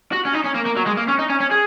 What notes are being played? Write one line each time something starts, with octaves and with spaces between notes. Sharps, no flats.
F#4
C#4
D#4
C#4
A#3
A#3
F#3
G#3
A#3
C#4
D#4
C#4
C#4
G#4